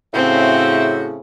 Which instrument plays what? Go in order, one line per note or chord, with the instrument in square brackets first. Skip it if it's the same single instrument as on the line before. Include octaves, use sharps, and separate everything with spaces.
[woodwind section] A2 C#3 [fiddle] C4 [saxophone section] F#4 C5 E5